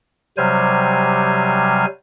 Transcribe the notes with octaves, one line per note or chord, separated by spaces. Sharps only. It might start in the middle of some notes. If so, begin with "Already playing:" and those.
C3 F#3 G3 C5 G#5 F6